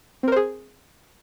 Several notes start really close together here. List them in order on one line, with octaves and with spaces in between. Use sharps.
C4 A#4 C5 G#4